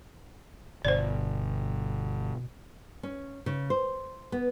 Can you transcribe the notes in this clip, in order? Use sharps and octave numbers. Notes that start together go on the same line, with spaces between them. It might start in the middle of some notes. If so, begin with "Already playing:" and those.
G1 B2 C5 D5
C#4
C#3
C5
B3